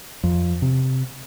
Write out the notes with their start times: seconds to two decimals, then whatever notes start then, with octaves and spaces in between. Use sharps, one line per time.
0.23 F2
0.62 C3